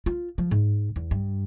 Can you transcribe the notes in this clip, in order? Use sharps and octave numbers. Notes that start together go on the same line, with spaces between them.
F4
F3
G#2
E2
G2